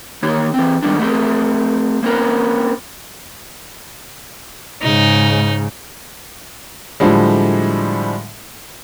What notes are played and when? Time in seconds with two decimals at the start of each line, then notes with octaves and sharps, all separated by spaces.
0.23 D#3 A#3 D#4 C#5
0.54 E3 C4
0.82 D#3 G3 G#3 B3 D4
1.00 A3 C4 F#4 G#4 A#4
2.03 A#3 C4 C#4 A#4 B4
4.82 G#2 C#3 D#4
7.00 A2 D3 F3 G3 G#3